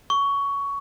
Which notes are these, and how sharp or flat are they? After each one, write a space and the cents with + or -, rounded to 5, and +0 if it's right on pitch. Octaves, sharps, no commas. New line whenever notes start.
C#6 +15